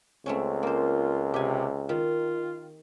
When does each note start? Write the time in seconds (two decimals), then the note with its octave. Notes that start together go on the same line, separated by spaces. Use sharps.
0.26 C#2 A3 C4 C#4
0.63 A#3 F4 C5
1.34 C3 G4 G#5
1.89 D#3 F4